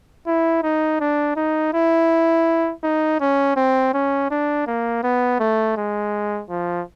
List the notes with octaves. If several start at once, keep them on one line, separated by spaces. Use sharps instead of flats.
E4
D#4
D4
D#4
E4
D#4
C#4
C4
C#4
D4
A#3
B3
A3
G#3
F3